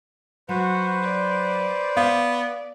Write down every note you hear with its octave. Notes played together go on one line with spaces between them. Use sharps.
F#3 F#4 B4 C5
D5
B3 F5